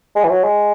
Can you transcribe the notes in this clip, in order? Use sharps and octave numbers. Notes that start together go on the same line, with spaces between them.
G#3
E3
F#3
G#3